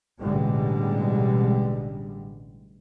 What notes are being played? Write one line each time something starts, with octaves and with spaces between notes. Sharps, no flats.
A1 B2 D3 G3 G#3